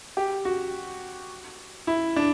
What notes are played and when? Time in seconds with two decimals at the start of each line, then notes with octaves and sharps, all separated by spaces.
0.17 G4
0.45 F#4
1.87 E4
2.16 D4